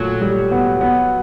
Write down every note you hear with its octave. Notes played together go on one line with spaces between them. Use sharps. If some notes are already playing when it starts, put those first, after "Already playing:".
Already playing: A#2 F#3 A3
G3
B3
B3